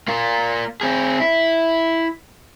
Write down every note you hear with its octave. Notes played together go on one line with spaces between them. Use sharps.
A#3 F4
C4 G#4
E4